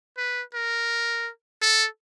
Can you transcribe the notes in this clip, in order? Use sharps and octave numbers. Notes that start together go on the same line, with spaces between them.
B4
A#4
A4